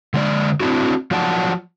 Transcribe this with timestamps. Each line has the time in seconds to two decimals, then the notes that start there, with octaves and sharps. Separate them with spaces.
0.14 D3 G#3 D5
0.60 C4 D4 E4 F#4
1.11 F3 F#3 F4 D5 F#5 A5